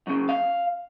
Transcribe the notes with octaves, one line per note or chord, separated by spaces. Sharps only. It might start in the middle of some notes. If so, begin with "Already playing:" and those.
F#2 C#3
F5